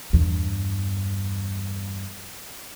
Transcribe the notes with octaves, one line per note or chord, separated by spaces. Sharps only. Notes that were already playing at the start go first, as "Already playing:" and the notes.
E2 G2